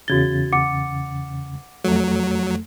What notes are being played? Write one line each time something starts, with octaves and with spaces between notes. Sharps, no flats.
E2 C#3 F#4 G#6 A6 G7
F#5 D6 C#7
F2 F#3 A3